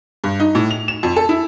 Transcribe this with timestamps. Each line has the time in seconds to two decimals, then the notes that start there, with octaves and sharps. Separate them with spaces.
0.24 G2
0.40 D#4
0.55 A2
0.71 F7
0.88 E7
1.03 F2
1.16 A4
1.29 E4